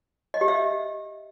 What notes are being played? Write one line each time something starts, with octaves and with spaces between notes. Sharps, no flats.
D#5
G4
E5